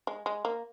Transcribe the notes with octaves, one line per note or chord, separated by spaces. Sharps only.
G#3
G#3
A#3